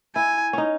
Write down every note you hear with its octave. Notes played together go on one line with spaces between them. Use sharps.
E4 G#5
C#4 D#4